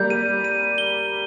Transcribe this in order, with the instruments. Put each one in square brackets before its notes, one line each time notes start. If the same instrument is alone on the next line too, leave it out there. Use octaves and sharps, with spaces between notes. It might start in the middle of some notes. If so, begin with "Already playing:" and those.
Already playing: [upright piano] G3 A#3 [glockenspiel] G6
[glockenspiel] D#7
D#7
G7